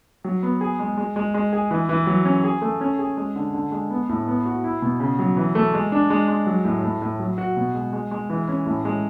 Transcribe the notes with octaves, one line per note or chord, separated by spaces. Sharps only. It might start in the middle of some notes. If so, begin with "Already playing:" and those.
F#3
B3
G#4
G#3
G#3
G#3
G#3
G#4
E3
E3
F#3
C#4
G#4
A3
C#4
G#4
G#3
D3
D3
G#3
B3
A2
B3
F#4
E4
B2
C#3
F#3
E3
A3
G#3
D4
G#3
G#3
F#3
A2
A2
A2
F#3
F#4
B2
G#3
G#3
G#3
E3
C#4
A2
G#3